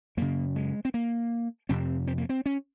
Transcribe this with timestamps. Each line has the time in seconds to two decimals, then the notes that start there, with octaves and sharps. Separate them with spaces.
0.17 F#2 C#3 A#3
0.56 G#3
0.85 C4
0.94 A#3
1.69 F2 C3 C4
2.07 C4
2.18 A#3
2.29 C4
2.46 C#4